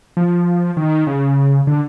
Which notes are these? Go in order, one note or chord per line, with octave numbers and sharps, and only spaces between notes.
F3
D#3
C#3
D3